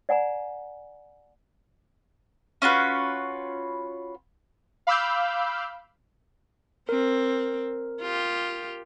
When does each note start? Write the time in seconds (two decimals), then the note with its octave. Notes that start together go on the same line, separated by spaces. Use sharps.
0.09 D5 F#5 G#5 A#5
2.62 C#4 F4 F#4 B4
4.87 F5 B5 D6 E6 F6 G6
6.89 C4 A#4
8.01 F4 G4